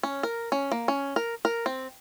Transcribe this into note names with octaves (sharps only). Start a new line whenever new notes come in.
C#4
A#4
C#4
A#3
C#4
A#4
A#4
C4